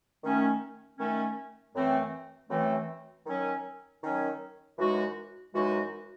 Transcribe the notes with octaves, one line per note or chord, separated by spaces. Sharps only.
D#3 A3 C#4
D#3 A3 C#4
F#2 E3 A3 C4
F#2 E3 A3 C4
D#3 F#3 C#4
D#3 F#3 C#4
F#2 E3 G#3 D#4 F#4
F#2 E3 G#3 D#4 F#4